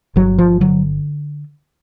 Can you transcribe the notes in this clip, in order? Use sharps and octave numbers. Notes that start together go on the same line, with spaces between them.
G1 F#3
F3
D3 F#3